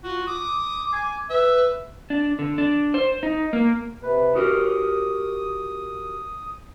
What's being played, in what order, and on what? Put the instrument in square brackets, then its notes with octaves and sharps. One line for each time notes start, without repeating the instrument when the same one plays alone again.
[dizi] F4 [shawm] F#4
[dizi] D6 [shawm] D#6
[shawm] G#5
[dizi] B4 [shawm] E5
[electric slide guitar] D4
D3
D4
C5
D#4
A#3
[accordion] C3 B4
[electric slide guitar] F#4 G4 A#4 [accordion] D#6